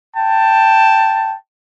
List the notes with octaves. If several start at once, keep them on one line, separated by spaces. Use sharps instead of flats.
G5 A5